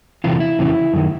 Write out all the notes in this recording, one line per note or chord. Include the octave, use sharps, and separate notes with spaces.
E2 C3 E3 F4
E4
F2 C#3 E3
F#2 D#3